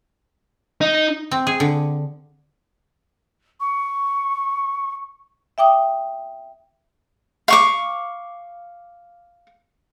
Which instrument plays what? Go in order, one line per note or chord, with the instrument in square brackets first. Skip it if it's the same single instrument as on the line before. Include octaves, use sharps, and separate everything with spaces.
[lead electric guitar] D#4
[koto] C4
G#4
D3
[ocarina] C#6
[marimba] E5 G5 D6 D#6
[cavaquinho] F5 C#6 D6